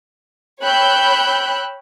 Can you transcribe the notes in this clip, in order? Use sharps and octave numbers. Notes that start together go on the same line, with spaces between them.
C#5 G5 B5 E6 F#6 G6